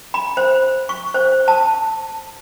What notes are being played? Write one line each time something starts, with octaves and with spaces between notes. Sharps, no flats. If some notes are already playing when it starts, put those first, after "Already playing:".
B5
C5
C#6
C5
A5